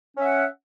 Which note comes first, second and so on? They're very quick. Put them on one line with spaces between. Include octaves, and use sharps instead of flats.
C#4 E5 F#5